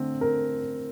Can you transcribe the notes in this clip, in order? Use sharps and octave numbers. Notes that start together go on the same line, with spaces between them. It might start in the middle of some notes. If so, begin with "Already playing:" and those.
Already playing: D3 A3 C4
A#4